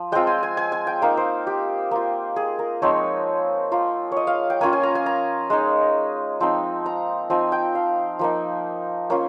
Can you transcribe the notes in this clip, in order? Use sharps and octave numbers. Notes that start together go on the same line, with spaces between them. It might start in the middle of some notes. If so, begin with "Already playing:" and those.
Already playing: F3
G#3 C4 F4 G5
G#5
G#5
G#5
G#5
G5
A#3 D#4 F5
C5
G4
A#3 F4
G#4
A#4
F3 G#3 C4 D#4 C#5
A#3 F4
C#5 D#5
F5
G5
A#3 C#4 F4 G#5
G#5
A#5
G#5
A#5
G#3 D#4
F3 C4 D#4
A#5
F3 C4 D#4 G#5
G5
F5
F3 A#3 D#4
A#3 C#4 F4